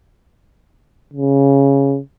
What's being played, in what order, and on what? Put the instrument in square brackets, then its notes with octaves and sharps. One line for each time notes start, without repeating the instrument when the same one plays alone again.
[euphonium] C#3